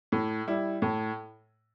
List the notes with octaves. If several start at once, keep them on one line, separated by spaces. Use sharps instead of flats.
A2
G3 E4
A2